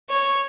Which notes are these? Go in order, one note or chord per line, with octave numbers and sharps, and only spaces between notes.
C#5